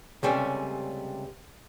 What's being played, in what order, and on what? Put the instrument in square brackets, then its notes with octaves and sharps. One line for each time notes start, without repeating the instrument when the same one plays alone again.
[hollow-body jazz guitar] C#2 C3 G3 A3 C#4